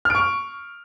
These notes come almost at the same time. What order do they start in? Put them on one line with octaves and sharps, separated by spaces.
F6 D7 C#6